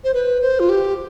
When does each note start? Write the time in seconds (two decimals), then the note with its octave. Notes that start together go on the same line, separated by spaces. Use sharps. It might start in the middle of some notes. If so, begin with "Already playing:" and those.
0.04 C5
0.14 B4
0.42 C5
0.60 F4
0.69 G4